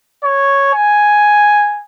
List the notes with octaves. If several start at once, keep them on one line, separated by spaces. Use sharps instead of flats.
C#5
G#5